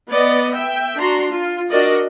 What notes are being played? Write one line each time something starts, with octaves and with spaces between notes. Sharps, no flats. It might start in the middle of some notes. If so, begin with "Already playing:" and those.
B3 D5 D#5
E5 G5
D4 F#4 A#5 C6
F4
D4 F#4 A#4 D5 D#5